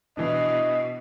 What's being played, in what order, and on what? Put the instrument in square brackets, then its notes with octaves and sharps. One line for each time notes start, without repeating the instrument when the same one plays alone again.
[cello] B2 [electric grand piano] E3 D4 [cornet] D#5